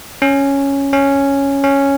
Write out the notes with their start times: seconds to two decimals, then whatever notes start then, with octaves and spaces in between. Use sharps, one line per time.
0.22 C#4
0.93 C#4
1.64 C#4